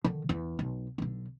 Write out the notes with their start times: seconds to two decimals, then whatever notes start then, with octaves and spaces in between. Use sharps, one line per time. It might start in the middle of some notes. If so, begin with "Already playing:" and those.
0.04 D3 D#3
0.29 E2
0.59 B1
0.98 B1 D3